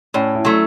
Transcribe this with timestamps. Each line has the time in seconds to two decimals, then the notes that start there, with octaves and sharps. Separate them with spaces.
0.14 A2 C#4
0.35 E4
0.45 F#3 A3